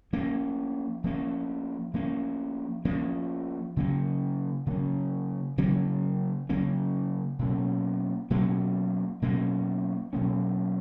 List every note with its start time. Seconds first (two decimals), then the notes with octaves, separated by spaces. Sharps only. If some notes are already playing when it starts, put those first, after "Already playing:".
0.13 F3 A#3 C#4
1.04 F3 A#3 C#4
1.94 F3 A#3 C#4
2.85 F3 A#3 C#4
3.77 C#3 F#3 A#3 C#4
4.66 C#3 F#3 A#3 C#4
5.58 C#3 F#3 A#3 C#4
6.49 C#3 F#3 A#3 C#4
7.39 B2 F#3 A#3 C#4
8.30 B2 F#3 A#3 C#4
9.22 B2 F#3 A#3 C#4
10.13 B2 F#3 A#3 C#4